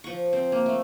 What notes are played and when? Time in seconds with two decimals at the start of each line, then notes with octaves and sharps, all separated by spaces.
0.04 F3 F#5 C#6
0.33 C4
0.52 A#3
0.66 A3